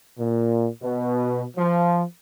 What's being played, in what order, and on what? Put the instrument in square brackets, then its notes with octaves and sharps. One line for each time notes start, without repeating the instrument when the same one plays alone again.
[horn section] A#2
B2
F3